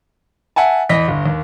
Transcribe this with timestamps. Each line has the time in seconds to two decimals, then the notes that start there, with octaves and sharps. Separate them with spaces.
0.56 E5 F#5 G#5 A5
0.89 E2 D#5 A#6 B6
1.08 G1
1.26 D#2